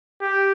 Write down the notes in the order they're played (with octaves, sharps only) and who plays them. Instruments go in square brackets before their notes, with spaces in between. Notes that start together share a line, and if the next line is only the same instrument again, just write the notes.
[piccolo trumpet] G4